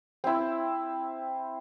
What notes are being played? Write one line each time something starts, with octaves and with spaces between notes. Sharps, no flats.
C4 E4